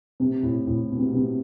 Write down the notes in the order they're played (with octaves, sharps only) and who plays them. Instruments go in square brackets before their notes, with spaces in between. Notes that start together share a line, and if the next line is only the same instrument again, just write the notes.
[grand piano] C3
A2
A2
B2
C3
B2
C3